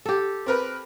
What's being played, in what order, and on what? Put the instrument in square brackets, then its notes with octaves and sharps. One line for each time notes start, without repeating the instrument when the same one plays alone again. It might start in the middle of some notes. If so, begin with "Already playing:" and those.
[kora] G4 A4
[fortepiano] C4 A#4 B4